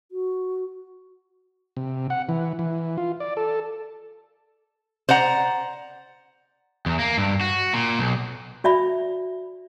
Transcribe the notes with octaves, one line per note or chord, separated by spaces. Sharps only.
F#4
C3
F#5
E3
E3
F4
D5
A4
C5 D5 F#5 A#5
E2
A#3
G2
F#4
A#2
B1
F#4 D5 E5 B5